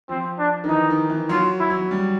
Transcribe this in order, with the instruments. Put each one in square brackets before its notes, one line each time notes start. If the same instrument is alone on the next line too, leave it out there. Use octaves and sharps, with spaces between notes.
[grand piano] F3 [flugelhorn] C4
[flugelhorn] D4
[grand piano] D#3
[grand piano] E3 [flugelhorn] D#4
[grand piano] D#3
E3
[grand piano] F#3 [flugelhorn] F4
[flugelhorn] E4
[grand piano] F#3
G3